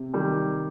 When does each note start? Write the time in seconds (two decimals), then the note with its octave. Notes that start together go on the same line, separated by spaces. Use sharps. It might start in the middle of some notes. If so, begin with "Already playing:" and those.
Already playing: C3
0.14 D#3 G3